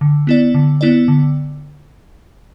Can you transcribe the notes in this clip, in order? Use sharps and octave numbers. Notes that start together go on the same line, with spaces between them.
D3
B3 E4 D5
D3
B3 E4 D5
D3